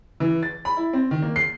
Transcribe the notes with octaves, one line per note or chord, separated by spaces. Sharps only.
E3
A6
B5
E4
C4
D#3
A#3
C7